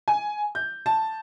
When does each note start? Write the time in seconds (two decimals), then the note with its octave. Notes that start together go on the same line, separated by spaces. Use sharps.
0.08 G#5
0.55 G6
0.86 A5